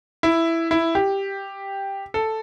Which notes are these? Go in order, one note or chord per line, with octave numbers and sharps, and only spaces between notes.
E4
E4
G4
A4